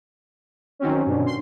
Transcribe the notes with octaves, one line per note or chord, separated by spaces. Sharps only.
D#3 F#3 C4 C#4
G2 B2 D3
C6